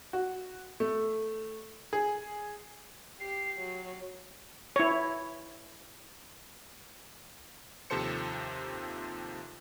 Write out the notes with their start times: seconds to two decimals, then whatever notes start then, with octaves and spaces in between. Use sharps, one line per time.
0.13 F#4
0.80 A3
1.93 G#4
3.20 G4 C7
3.59 F#3
4.76 E4 C#5
7.90 D#2 C3 F3 A4 C5 C#7